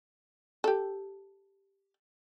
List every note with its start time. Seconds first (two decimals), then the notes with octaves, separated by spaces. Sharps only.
0.64 G4 A4